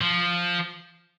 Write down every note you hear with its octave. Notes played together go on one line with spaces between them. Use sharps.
F3